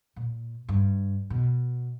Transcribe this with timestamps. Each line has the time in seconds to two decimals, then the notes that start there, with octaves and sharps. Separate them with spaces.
0.16 A#2
0.69 G2
1.30 B2